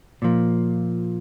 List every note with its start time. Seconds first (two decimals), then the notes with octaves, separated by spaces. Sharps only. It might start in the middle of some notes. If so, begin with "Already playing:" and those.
0.22 A#2 F3 A#3